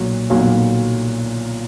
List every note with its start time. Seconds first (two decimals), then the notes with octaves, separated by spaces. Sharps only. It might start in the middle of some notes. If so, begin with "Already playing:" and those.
Already playing: B1 A#2 F#3
0.30 B1 A#2 F#3